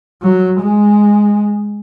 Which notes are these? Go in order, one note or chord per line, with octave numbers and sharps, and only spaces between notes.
F#3
G#3